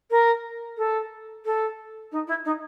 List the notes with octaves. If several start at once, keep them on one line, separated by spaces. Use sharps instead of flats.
A#4
A4
A4
D#4
E4
D#4